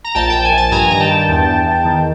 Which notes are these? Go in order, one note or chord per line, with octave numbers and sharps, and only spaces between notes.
A#5
A#1 G5 A5
A#1 G5
G#5
A#1
A5
G2 G#5 A#5
D#3 A#5
G5 A5
G2
E2
E2
E2
D#3